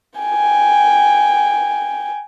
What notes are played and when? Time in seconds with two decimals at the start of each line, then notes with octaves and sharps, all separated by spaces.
0.20 G5 G#5